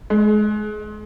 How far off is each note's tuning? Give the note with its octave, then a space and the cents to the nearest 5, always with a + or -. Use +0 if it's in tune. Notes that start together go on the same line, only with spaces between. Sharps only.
G#3 +30